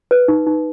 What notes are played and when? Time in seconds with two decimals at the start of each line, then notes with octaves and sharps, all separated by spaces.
0.11 B4
0.28 D#4
0.47 D#4